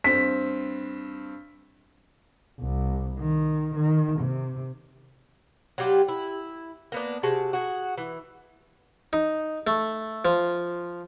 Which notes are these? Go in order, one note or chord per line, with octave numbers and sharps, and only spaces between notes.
G2 C4 B6
C2
D#3
D#3
C3
F#3 G3 F4 G4
E4
A#3 B3 D4
C3 F#4 G#4 A5
F#4 G#4
E3
D#4
A3
F3